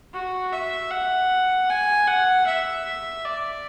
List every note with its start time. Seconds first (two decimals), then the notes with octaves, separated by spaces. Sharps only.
0.14 F#4
0.53 E5
0.91 F#5
1.70 G#5
2.08 F#5
2.47 E5
3.25 D5